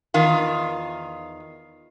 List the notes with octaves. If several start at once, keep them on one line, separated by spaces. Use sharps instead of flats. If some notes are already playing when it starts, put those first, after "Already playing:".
E2 D#3 F4